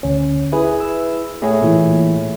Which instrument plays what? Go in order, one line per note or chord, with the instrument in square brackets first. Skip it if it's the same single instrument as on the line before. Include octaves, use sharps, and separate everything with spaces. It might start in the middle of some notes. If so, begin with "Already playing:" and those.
[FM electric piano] D2 C#4
[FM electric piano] E4 B4 [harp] G#4
[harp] E6
A2 G#4 C#5
[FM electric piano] A#2 E3